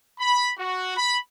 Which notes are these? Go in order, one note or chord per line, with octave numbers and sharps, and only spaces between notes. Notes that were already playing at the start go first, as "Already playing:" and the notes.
B5
F#4
B5